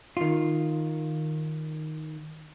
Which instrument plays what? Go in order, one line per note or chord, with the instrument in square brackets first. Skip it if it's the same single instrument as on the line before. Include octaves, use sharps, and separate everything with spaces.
[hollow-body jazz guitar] D#3 F4